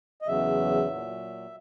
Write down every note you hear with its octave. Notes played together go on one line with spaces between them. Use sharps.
D#5
E2 C#3 F#3 E5
A#2 F#3